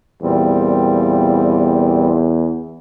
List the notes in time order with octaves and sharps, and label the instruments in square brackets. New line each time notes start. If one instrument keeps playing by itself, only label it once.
[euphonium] E2 [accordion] A#2 G3 C4